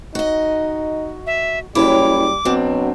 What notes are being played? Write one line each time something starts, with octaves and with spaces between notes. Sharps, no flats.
D#4 F#4 D#5
E5
F#1 G3 E4 C#5 G5 D6
B2 F#3 C4 D4